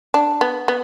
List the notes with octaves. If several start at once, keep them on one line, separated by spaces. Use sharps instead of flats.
D4
B3
B3